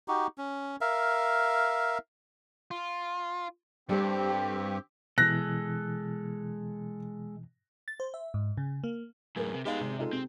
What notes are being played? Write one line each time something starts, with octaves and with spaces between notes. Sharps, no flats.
D#4 F#4 G4
C#4
A#4 E5 F5
F4
G2 G3 C4 G4 A4 C5
B2 E3 G#3 A4 F#6 A#6
A6
C5
E5
G#2
C#3
A#3
F#2 A2 G#4 A#4 B4
C3
G#3 B3 D#4 G4 F5
G#1 C3
G#3 D#4 F4 A4
C3 C4